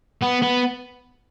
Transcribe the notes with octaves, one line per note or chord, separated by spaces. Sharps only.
B3
B3